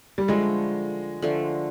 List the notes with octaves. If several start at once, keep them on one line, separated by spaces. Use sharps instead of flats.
G3
D3 F3 G#3 A3
D3 F3 A3